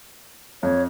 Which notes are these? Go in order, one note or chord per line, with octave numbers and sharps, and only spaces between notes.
F2 C#5